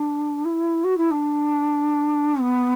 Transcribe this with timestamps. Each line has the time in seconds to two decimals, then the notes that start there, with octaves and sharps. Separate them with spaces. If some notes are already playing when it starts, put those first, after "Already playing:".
Already playing: D4
0.44 E4
0.84 F#4
0.97 E4
1.10 D4
2.40 B3